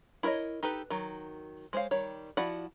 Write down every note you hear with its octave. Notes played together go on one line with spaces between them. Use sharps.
E4 A#4 C5 C#5 D#5
D#4 G4 A4 B4
D#3 F#3
G#3 C5 C#5 F5
D#3 G3 C#5
F3 E4 F#4 D5 F#5